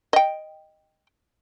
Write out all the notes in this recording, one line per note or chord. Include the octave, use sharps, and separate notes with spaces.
D#5 G5